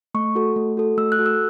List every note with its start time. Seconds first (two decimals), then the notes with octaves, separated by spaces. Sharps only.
0.14 A3 C#6
0.35 F#4 A4
0.56 A3
0.77 F#4 A4
0.97 A3 E6
1.12 F#6
1.19 F#4 A4
1.26 E6